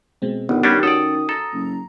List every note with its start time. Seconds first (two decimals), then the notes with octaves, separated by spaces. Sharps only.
0.22 B2 G#3 C4
0.49 G1 D#3 B3
0.63 G3 C#4 D4 G4
0.83 C#4 F#4 A4 D5 D#6
1.29 A4 A#5
1.53 F#1